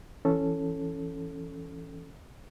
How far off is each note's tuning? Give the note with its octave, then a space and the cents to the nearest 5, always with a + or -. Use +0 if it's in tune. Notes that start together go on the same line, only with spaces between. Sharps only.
E3 +10 C#4 +0 A4 +0